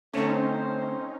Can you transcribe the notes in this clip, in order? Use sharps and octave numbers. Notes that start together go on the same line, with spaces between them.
D3 A3 C4 C#4 D#4 C5